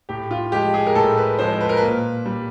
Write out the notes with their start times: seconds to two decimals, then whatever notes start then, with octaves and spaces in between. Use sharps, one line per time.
0.09 A2 G4
0.31 F4
0.52 F3 G#3 G4
0.74 G#4
0.87 A#4
0.95 A2 A4
1.17 B4
1.38 F3 G#3 C5
1.61 B4
1.69 A#4
1.77 B4
1.82 A#2
2.26 G3